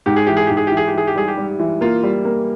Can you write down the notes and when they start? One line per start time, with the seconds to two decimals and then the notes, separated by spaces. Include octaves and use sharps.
0.06 G#2 G4
0.16 G#4
0.27 E3 G4
0.37 G#4
0.47 G#2 G4
0.57 G#4
0.67 E3 G4
0.77 G#4
0.88 G4
0.94 E3 G#4
1.07 G4
1.16 G3 G#4
1.28 G4
1.37 G3
1.59 E3
1.81 A#3 F4
2.03 G3
2.25 A#3